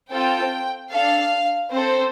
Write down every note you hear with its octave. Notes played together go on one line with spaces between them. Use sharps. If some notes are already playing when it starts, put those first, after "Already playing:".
C4 F4 A4 G5
D4 A4 F5
C4 A4 C5